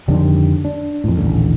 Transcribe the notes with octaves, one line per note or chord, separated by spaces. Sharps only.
F2 D3 D#3 G3
D4
F2 A2
D#1 A1 D3